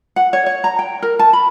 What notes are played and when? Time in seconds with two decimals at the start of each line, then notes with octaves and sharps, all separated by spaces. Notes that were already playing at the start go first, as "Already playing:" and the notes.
0.16 F#5
0.33 C#5
0.46 C#5
0.64 A#5
0.79 G5
1.02 A#4
1.19 A5
1.33 B5